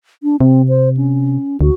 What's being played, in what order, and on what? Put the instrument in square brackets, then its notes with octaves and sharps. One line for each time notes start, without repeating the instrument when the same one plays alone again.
[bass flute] D4
[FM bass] C3 [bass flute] C4
[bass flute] C5
C#4
[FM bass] D2 [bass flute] F#4